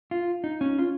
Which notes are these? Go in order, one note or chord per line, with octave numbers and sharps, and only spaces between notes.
F4
D#4
C#4
F4